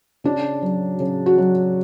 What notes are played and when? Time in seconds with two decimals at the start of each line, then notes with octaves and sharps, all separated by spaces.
0.24 C#3 D4
0.62 F#3
1.00 C#3
1.26 F#4
1.38 F#3